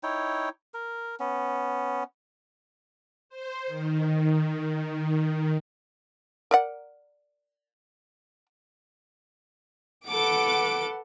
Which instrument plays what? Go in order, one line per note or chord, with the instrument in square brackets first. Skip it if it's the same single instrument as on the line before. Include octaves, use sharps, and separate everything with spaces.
[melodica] D#4 E4 C#5 G5
A#4
B3 C#4
[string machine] C5
D#3
[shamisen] A#4 D5 F#5
[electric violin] A4 D7 [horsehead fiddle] B4 F#5 [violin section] D6